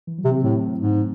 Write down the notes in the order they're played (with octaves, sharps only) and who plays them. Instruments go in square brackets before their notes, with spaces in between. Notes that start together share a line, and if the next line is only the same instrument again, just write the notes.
[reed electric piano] E3
F#3
[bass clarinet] C3
[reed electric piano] C4
[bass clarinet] A2 [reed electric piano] A3
[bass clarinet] G#2